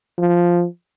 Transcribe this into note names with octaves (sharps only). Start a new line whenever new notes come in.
F3